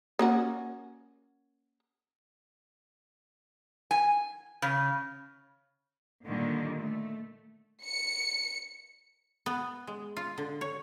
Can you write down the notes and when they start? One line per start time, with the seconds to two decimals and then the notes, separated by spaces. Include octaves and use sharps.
0.19 A#3 C#4 F#4
3.91 G#5
4.62 C#3
6.25 A#2 D3 D#3 G3
6.77 A3
7.84 C#7
9.46 B3
9.87 G#3
10.17 F4
10.38 D3
10.61 C#5